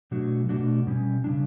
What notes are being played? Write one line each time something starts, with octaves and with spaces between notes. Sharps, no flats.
B2 F#3 A3 D4 F#4
B2 A3 D4 F#4
B2 G3 C#4
C#3 G3 D4